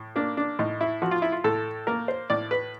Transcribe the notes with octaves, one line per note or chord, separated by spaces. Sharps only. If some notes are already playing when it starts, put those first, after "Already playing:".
Already playing: A2
A#3 D4
D4
A2 D#4
E4
F3 F#4
F4
E4
F4
A2 A4
A#3 A#4
C5
A2 D5
B4